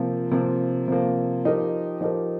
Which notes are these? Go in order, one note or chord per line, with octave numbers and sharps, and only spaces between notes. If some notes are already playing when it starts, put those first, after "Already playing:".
Already playing: C3 F3 A#3
C3 F3 A#3
C3 F3 A#3
F3 D#4 G4 A#4
F3 D#4 G4 A#4